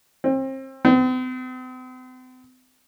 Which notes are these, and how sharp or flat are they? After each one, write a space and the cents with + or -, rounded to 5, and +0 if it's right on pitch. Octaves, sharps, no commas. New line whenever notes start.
C4 +30
C4 -45